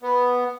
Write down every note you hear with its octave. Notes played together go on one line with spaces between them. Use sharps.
B3